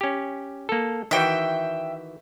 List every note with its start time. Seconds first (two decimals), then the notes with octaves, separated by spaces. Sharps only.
0.01 C#4 G4
0.69 A#3 A4
1.11 D#3 E3 F#4 E5 G5